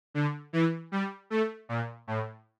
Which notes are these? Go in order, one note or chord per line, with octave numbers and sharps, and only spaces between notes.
D3
E3
G3
A3
A#2
A2